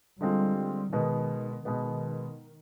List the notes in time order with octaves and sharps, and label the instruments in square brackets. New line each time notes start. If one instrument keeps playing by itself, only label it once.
[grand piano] D3 G#3 C4 F4 [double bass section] G3
[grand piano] B2 G#3 B3 [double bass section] D#3
[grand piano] B2 G#3 B3 [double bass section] D#3